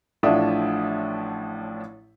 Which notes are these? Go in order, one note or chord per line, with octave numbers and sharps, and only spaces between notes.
A1 A2 F3 D4 E5 D#6